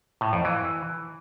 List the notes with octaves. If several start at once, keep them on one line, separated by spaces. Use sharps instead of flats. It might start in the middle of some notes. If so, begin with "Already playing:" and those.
A2
F2
E3